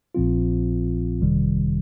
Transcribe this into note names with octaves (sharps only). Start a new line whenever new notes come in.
A#1 A#2 F3 C4 F4
G1 F2 C3 D#3 G3